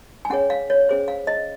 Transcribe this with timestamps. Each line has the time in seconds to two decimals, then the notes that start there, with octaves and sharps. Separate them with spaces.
0.25 G#5
0.30 C#4 G#4 C#5 F#5
0.50 F5
0.70 C#5
0.89 C#4 G#4 C5
1.08 F5
1.27 D#5